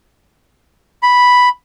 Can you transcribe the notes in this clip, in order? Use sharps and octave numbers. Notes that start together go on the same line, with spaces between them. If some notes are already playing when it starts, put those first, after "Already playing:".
B5